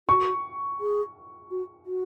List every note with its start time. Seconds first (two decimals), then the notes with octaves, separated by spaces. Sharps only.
0.09 F#4 C#6
0.80 G#4
1.51 F#4
1.86 F#4